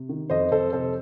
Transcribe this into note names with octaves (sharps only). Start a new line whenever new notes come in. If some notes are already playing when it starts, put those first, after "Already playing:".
Already playing: C3
D#3
F2 C5 D#5
F2 A4 C5
C3 A4 C5